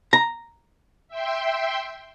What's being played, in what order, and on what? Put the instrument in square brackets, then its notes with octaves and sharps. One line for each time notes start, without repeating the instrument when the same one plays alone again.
[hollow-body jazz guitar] A#5
[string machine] E5 G5 C6